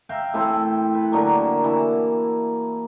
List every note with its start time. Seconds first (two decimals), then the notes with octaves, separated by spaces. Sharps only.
0.09 E5 F5 G5 A#5
0.34 A2 E3 C4 A4
0.95 B4
1.12 D3 F#3 A#3
1.64 E3